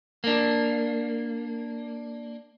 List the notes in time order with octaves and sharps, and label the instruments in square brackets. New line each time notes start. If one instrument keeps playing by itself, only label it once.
[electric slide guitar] A#3 D4